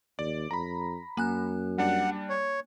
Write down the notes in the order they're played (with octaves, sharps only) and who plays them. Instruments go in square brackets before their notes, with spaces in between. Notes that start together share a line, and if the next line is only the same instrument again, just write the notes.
[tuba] D#2 [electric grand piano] D5
[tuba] F2 [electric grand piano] A#5 B5
[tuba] F#2 [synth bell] A#3 G#5 F#6
[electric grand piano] G3 D4 [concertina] F#5
[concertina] C#5